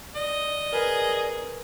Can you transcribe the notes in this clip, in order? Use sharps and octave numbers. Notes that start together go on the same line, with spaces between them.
D5 D#5
G#4 A#4 B4 G#5